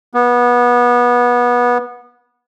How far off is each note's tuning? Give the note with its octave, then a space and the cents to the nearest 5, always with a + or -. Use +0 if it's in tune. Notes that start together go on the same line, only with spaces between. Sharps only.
B3 -25